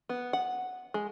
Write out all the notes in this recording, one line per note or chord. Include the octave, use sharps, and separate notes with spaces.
B3
F#5
G#3